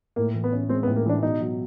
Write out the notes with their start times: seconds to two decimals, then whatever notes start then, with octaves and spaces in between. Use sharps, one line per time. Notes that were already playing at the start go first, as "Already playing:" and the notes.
0.16 A2 A#3
0.34 E3
0.44 B3
0.53 C#4
0.69 G#3 C4
0.83 B3
0.87 A2
0.96 A#3
1.06 E3 D4
1.23 B2 D#4
1.41 F#3